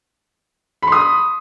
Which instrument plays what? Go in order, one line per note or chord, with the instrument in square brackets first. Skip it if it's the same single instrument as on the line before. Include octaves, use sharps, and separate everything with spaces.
[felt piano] B5
C6
D#6